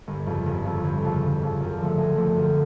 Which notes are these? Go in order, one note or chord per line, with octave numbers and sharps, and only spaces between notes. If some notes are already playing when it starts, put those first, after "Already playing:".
G1
F2 C#3
G1
F2 C#3
G1
F2 C#3
G1
F2 C#3
F#2
D3 F3 A3
F#2
D3 F3 A3
F#2